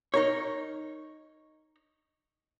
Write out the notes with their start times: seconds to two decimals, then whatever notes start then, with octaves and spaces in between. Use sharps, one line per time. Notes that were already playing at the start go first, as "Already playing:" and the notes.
0.14 D#4 A#4 C#5